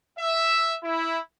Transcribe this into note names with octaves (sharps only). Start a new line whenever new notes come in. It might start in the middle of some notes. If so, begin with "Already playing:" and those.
E5
E4